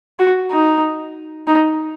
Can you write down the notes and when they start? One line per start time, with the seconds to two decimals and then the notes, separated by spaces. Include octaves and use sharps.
0.19 F#4
0.51 D#4
1.47 D#4